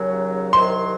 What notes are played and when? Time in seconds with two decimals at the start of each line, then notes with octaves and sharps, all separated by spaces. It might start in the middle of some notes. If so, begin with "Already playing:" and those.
Already playing: D#2 C#3 F#3
0.53 C2 C3 D#3 F#3 C6